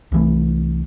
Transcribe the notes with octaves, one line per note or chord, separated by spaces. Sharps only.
C2 E3 A3